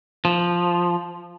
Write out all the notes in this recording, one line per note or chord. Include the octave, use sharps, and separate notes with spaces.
F3